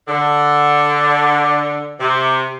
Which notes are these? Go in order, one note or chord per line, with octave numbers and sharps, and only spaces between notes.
D3
C3